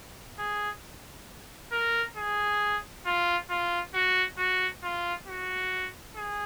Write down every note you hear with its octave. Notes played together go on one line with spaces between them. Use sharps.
G#4
A#4
G#4
F4
F4
F#4
F#4
F4
F#4
G#4